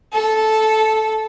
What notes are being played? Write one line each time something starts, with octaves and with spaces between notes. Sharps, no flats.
A4